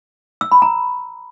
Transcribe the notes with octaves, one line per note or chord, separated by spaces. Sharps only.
E6
B5
A#5